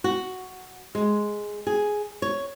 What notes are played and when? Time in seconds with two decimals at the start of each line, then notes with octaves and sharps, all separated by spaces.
0.04 F#4
0.95 G#3
1.67 G#4
2.22 C#5